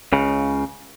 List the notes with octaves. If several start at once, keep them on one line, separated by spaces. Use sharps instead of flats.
C#2 C#3